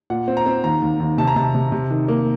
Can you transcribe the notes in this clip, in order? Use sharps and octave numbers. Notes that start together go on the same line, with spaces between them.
A#2 F#5
C4
A#5
C4
D#2 A#5
D#2
D#2
C3 A5
A#5
C3 A5
C3
C3
D#3
A#3